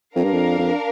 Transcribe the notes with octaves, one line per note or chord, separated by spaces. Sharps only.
F2 D4 A#4 F5
G2
F2
F2